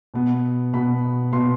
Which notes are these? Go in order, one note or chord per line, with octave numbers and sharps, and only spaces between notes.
B2 B3
B2 B3 B5
B2 B3 C6